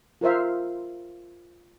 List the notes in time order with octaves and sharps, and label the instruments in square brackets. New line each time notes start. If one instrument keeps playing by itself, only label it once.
[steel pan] F4 A#4 C5 E5 F5